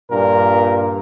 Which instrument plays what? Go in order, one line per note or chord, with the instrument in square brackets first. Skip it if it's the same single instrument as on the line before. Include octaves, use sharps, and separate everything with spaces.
[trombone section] G2 A#2 [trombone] A#4